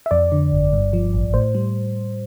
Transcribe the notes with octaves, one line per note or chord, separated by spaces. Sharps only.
E5
F2 D5
D3
G1
G2
F3
A1
A2 C5
G3